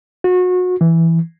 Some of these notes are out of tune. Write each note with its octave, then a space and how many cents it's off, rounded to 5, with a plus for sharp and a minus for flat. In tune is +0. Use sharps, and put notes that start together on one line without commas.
F#4 -30
E3 +0